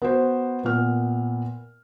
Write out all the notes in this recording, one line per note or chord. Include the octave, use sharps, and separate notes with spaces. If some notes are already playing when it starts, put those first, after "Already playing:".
B3 F#4 C5
A#2 B3 F6